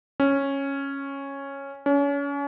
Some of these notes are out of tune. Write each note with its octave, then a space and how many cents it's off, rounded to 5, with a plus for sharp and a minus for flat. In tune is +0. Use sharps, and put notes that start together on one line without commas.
C#4 -10
C#4 +30